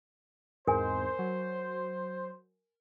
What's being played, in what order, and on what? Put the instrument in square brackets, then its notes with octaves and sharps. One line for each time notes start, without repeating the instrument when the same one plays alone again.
[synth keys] E2 G#2 C4 [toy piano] A#4 G#5 [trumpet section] C5
[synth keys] F#3